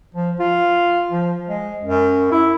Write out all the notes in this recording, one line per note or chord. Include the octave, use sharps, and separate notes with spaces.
F3
F4
F3
G#3
F#2
E4